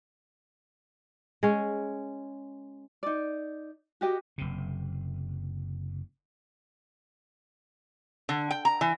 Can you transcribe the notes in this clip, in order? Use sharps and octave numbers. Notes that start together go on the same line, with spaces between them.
G#3 C#4
D#4 D5
F#4 G4 D#5
F#1 C3
D3
G5
A#5
E3